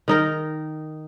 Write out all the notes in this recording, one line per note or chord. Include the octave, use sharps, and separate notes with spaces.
D#3 D#4 A#4